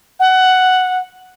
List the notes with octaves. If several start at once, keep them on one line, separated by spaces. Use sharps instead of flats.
F#5